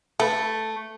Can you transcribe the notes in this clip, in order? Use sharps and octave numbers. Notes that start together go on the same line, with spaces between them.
A3 A4 B4